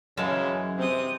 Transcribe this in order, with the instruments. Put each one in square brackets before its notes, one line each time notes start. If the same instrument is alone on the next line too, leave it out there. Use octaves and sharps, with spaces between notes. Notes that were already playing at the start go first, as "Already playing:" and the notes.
[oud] F#2 [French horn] C#3 [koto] E3 G#3 A5
[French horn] C3 [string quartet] C4 C5 D#6